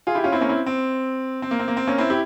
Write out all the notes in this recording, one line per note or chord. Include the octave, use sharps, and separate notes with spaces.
F4 G#4
E4 G4
C#4 F4
C4 E4
A#3 C#4
C4 E4
C4
C4
A#3
C4
A#3
C4
A#3 C#4
C4 E4
E4 G4